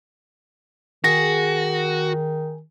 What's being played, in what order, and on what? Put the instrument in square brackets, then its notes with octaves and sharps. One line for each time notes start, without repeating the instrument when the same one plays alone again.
[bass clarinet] D#3 [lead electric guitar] F#4 [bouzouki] G#4 [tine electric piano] A#6